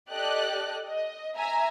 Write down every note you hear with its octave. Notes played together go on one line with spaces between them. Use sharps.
G4 A4 D5 D#5 F#6
D#5
E5 G#5 A#5